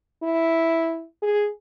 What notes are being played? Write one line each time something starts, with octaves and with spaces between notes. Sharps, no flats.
E4
G#4